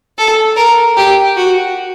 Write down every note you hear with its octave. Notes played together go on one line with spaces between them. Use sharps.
A4
A#4
G4
F#4